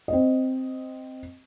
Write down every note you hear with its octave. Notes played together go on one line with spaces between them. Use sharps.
C4 D#5